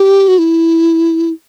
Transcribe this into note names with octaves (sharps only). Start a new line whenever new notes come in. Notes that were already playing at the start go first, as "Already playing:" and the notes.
Already playing: G4
F#4
E4